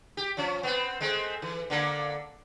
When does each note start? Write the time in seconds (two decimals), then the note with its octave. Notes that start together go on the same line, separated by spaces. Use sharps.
0.17 G4
0.37 F3 C#4
0.63 B3 C4
1.01 G#3 A3 C4
1.42 E3
1.70 D3 A#3 A4